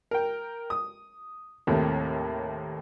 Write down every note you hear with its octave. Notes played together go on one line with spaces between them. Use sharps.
A#4 G5
D#6
D#2 A2 C3 A#3